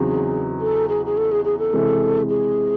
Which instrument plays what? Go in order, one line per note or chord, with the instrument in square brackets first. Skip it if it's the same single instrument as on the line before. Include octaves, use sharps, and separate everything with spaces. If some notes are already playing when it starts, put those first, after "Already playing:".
Already playing: [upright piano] E2 C#3 F#3 C4 D#4 [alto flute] G#4
[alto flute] A4
G#4
G#4
A4
G#4
G#4
A4
[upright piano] C3 E3 G#3
[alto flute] G#4